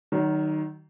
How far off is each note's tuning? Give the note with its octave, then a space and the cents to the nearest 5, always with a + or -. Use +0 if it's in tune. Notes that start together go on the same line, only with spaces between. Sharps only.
D#3 -10 F#3 +30